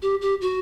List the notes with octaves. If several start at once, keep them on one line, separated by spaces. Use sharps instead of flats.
G4
G4
F#4